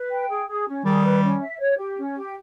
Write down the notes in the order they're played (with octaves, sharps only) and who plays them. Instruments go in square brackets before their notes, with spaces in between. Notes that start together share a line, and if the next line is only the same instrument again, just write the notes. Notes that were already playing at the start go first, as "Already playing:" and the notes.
Already playing: [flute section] B4
G5
G#4
G#4
C#4
[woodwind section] D#3 G3 [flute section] G#4
[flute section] B4
C#4
E5
C#5
G4
C#4
G4